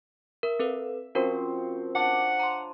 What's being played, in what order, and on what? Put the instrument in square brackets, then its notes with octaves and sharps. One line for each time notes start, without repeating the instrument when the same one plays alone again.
[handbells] A#4 [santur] E5
[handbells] C4 A4 B4
[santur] F3 C4 C#6 [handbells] C#4 F#4 A#4
[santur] D4 C#5 D5 [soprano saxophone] F#5
[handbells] A#5 C6